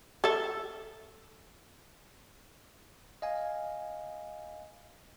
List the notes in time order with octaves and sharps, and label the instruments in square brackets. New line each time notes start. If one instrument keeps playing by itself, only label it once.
[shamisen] A4 E5
[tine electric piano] D#5 F5 G#5